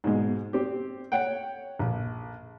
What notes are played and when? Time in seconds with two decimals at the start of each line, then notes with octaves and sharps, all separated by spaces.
0.04 G#2 B2 G#3
0.53 C4 G4
1.12 C#5 F#5 G5
1.79 A#1